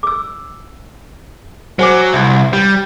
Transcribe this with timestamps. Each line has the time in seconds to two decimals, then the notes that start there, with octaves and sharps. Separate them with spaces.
0.03 D6 E6
1.79 F#3 C5 G#5 D6
2.13 C2
2.53 G3